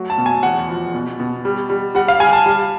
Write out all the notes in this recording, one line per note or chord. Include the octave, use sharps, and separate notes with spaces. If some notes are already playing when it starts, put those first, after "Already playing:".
Already playing: F#3 A3
A5
B2
G#5
E2 F#5
F3
B2
B2
G3
G3
G3 F#5
F5
G3 G#5
A5
G3